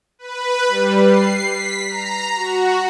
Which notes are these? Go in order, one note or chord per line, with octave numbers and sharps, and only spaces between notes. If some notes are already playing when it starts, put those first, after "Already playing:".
B4
G3
C7
B6
A#5
F#4